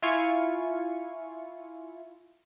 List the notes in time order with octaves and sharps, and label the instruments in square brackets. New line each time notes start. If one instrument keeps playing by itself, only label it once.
[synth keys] E4 F4 F5 G#5 C#6